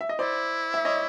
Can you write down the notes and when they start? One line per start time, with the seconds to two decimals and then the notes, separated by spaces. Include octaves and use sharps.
0.01 E5
0.09 D#5
0.19 E4 C5 D5
0.74 E5
0.85 C#5 D#5